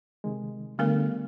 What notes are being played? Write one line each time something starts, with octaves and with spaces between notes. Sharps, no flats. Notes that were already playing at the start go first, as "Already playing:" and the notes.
C3 D#3 G#3
D3 G3 A3 B3 A#4 F5